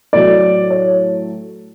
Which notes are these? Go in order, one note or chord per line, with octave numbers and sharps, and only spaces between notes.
A2 F#3 A3 D5
C#5